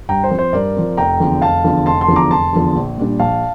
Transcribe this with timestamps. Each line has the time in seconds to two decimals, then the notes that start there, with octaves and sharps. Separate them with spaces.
0.09 G2 G5 A#5
0.24 C5
0.31 F3 C4
0.38 C5
0.53 G2 A#4 D5
0.76 F3 C4
0.97 F1 G5 A#5
1.20 E2 D3 F3
1.42 F1 F5 A5
1.64 E2 D3 F3
1.86 F1 A5 C6
2.01 A5 C6
2.08 E2 D3 F3
2.16 A#5 D6
2.31 F1 A5 C6
2.53 E2 D3 F3
2.75 A#1
2.98 A#2 G3 D4
3.19 A#1 F5 A5